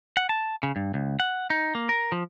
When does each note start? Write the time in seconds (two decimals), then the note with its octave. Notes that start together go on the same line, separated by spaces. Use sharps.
0.17 F#5
0.29 A5
0.63 C#3
0.76 G2
0.94 C#2
1.20 F#5
1.50 D#4
1.75 A#3
1.89 A#4
2.12 F3